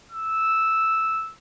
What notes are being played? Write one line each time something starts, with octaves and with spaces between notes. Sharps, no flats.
E6